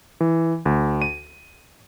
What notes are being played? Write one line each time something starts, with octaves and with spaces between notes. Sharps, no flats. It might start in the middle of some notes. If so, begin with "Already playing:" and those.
E3
D2
D#7